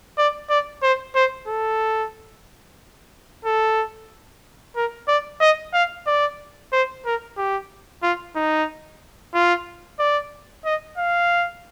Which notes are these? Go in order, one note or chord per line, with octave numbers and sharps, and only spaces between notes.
D5
D5
C5
C5
A4
A4
A#4
D5
D#5
F5
D5
C5
A#4
G4
F4
D#4
F4
D5
D#5
F5